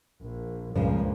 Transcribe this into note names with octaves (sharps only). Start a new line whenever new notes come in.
A#1
C#2 G2 A#2 C#3 F3